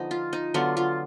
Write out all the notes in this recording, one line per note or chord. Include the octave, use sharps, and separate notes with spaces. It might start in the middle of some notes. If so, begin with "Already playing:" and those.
Already playing: D3 F3 B3 D#4
F4
D#4
D3 F#3 B3 F4
F4